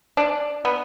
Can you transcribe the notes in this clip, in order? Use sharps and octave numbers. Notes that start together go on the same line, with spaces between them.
D4
B3